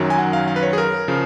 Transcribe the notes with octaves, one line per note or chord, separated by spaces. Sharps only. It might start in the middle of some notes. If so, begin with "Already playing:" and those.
Already playing: F#2 D#3 F#3
G#5
F#5
F5
F5
B4
C#5
G#4
A#4
C#3 F3